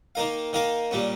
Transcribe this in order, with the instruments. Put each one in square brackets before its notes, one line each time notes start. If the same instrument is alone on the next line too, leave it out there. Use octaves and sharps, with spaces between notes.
[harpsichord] D#3 A#3 D#4 A#4 F5
D#3 A#3 D#4 A#4 F5
A#2 G3 A#3 C#4